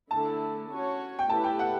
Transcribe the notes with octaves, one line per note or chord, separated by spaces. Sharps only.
D3 A3 E4 A5
C#4 F#4 C#5
G5
A3 E4 G4 B4 A5
G5
F#5